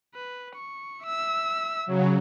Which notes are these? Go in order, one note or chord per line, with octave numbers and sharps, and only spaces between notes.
B4
C#6
E5 E6
C#3 F#3